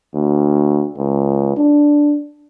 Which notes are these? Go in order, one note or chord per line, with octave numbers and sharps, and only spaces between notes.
D2
C#2
D4